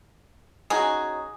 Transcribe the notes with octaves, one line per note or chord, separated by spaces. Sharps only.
C#4 D#4 F#4 G#4